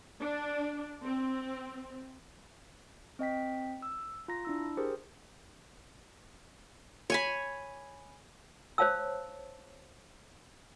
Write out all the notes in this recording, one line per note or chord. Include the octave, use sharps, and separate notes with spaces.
D4
C4
C4 D#5 G5 B6
E6
F4 A#5 A#6
D4 E4 E6
G4 G#4 A#4 C5
C#5 G#5 B5
C5 C#5 F5 A5 E6